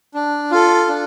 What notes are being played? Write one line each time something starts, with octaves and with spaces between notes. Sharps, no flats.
D4
F4 A4
D4